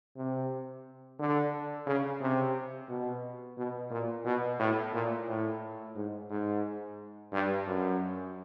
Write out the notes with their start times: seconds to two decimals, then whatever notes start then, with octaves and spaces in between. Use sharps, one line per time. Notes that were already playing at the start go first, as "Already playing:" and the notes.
0.17 C3
1.19 D3
1.86 C#3
2.21 C3
2.88 B2
3.57 B2
3.91 A#2
4.25 B2
4.59 A2
4.93 A#2
5.28 A2
5.95 G#2
6.30 G#2
7.32 G2
7.66 F#2